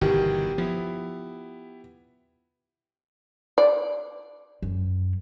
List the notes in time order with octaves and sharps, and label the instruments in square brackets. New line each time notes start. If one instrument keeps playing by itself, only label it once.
[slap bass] G1 [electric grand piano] B2 D#3 E3 [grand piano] G4
[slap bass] F3 [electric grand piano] B3 E4
[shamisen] D5
[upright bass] F#2